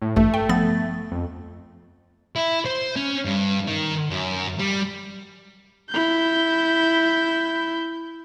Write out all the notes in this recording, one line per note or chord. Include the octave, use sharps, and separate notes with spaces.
A2
A1 G2 A3
A3 G5
F3 B3 A6
F2
E4
C5
C#4
G2
D#3
F#2
G3
E4 G6